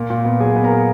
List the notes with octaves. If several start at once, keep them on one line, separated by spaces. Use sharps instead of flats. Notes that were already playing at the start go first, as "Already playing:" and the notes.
Already playing: A#2 A#4
A#2
B3
F#3 G#4 G#5
B3
A#4 A#5
A#2